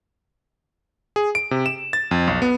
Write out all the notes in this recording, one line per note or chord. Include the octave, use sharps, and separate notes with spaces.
G#4
D7
C3
E7
A6
F2
B1
B3